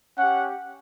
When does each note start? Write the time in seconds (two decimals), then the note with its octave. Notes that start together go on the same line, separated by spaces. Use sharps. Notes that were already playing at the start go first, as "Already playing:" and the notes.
0.18 C#4 G4 F#5